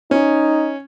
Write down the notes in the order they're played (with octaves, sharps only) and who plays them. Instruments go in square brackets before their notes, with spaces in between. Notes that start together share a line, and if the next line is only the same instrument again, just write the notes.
[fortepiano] C#4 [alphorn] D#4